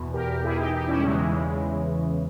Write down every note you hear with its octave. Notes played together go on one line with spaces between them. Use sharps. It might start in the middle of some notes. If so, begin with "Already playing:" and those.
Already playing: E2 B2
G4 A#4
E4 G#4
D#4 G4
D#4 G4
C#4 E4
G3
E2 C#3 E3 G#3